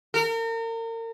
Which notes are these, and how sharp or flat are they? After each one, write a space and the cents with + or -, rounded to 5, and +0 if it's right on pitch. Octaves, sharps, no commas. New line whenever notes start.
A#4 -35